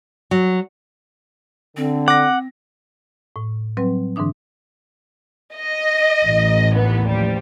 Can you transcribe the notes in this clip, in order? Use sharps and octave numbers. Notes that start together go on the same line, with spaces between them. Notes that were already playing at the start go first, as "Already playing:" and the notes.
F#3
D3 C4
F#5 D6 A#6
A2
F#3 G3 C4 B4
G#2 D3 E3 D4 D#6
D#5
A1
D#2 E3 B3
F3 G3